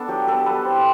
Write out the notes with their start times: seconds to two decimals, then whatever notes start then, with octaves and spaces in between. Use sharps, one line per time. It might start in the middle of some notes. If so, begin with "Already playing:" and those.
Already playing: B3 D4 A4
0.08 F#3 G4
0.27 B3 D4 A4
0.46 G3 B4
0.64 C4 E4 C5